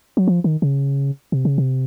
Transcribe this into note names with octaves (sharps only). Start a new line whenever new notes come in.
F#3
F3
D#3
C#3
C3
C#3
C3